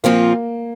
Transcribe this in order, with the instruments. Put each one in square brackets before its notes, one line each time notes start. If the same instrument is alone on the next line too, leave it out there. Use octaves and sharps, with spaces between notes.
[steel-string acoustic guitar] A#2 F3 C4 F4 [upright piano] A#3